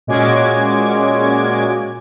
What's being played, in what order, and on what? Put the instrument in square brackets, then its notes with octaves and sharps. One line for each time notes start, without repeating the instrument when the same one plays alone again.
[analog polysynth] A#2 G#3 C#4 F#4 D6 G#6